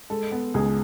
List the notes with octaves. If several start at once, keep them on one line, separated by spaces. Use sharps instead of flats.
G#3 A4
B3
C#2 G#4